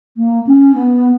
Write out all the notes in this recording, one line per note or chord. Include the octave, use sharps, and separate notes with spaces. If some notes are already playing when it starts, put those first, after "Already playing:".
A#3
C#4
B3